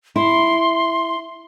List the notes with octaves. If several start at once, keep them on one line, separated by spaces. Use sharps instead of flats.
E4 C6